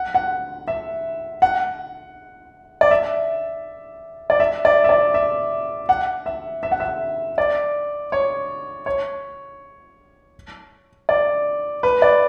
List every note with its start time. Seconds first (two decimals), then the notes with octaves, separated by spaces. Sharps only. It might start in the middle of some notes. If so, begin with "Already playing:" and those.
Already playing: F#5
0.15 F#5
0.68 E5
1.42 F#5
2.81 D5
2.91 E5
4.30 D5
4.40 E5
4.65 D5
4.84 E5
4.89 D5
5.14 E5
5.89 F#5
6.26 E5
6.63 E5
6.72 F#5
6.80 E5
7.38 D5
8.12 C#5
8.86 C#5
11.09 D5
11.83 B4
12.02 D5